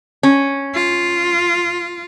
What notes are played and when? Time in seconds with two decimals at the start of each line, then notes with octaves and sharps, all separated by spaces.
0.23 C#4
0.75 F4